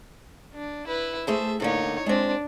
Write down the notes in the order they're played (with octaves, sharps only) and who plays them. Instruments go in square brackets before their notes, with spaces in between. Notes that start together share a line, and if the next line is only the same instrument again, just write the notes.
[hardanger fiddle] D4
E4 B4
[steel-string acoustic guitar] A3 G#4 A5 [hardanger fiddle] C5 E5
[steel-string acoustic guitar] A2 D3 A#3 [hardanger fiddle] D#4 C#5
[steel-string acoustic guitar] G#3 C4 [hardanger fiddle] D4